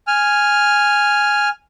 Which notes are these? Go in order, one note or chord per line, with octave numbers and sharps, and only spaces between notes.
G#5 F6